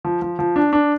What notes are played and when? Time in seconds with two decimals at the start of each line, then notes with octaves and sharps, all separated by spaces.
0.05 F3
0.22 F3
0.39 F3
0.56 D4
0.73 D4